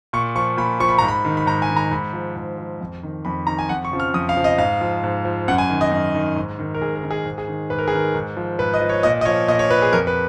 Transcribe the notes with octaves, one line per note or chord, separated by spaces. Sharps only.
A#2 C#6
F3 C#6
A#2 B5
F3 C#6
B5
G#2 A#5
B5
D#3
B5
G#2 A#5
G#5
D#3
A#5
G#2 B5
F3
G#2
F3
F2
D#3
F2 B5
D#3 A#5
G#5
F2 F#5
C#6
C#3 F3
F6
F2 D#6
F5
C#3 F3
D#5
G#2 F5
F3
G#2
F3
F#2 F#5
G#5
D#3
D#5
F#2
D#3
G#2
D#3
A#4
G#2 G#4
A#4
D#3
G#4
G#2
G#4
D#3
G#2 B4
A#4
G#4
D#3 A#4
G#2
F3
G#2 B4
D#5
F3
C#5
A#2 D#5
D#5
F3 C#5
A#2 D#5
C#5
F3 B4
G#4
F2 A#4
B4